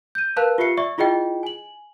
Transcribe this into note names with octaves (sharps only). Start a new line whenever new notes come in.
G6 D#7
A#4 B4 F5 A5 F#6
F4 G4 E5 C7 C#7
D5 E5 C#6
E4 F4 G#4 D#5 G5
G#5 F#7